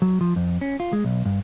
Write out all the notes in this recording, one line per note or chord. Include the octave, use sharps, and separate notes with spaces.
F#3
F3
F2
C#4
F4
G#3
B1
G2